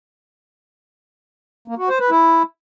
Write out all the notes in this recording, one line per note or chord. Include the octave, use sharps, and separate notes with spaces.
A#3
F#4
C5
B4
E4